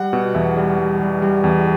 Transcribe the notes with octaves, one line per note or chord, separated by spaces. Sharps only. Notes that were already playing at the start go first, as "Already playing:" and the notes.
Already playing: G3 F#5
B2
E2 E5
G3
G3
G3
G3
E2